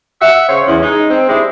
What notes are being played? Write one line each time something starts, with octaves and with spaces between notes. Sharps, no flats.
E5 F#5
C#3 C5 C#5
E2 C#4
G#3 D#4
C4
C3 G#3 D4 E4